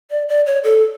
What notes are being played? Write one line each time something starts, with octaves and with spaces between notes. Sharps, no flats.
D5
D5
C#5
A4